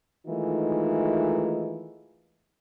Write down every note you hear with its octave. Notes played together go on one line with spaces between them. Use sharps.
D#3 E3 G#3 A3 D#4 F4